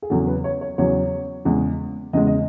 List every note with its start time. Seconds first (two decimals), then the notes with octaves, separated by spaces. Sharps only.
0.02 G#4
0.10 E2 C#3 F#3 A4
0.27 B4
0.44 C#5
0.61 C#5
0.78 E2 C#3 F#3 C#5
1.45 E2 C#3 G#3
2.13 E2 C#3 G#3 D#5
2.27 D#5